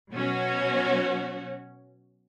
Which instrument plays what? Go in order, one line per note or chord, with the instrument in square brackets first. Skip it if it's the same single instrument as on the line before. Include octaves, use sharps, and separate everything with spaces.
[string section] B2 F#3 C#4 F#4 C#5